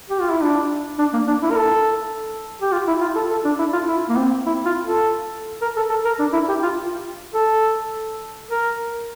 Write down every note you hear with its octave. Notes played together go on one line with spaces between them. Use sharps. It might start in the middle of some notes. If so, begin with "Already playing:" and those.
G4
F4
E4
D4
D4
A#3
D4
E4
A#4
A4
G4
F4
E4
F4
A4
A4
D4
E4
F4
E4
A#3
C4
E4
F4
A4
A#4
A4
A4
A#4
D4
E4
G4
F4
A4
A#4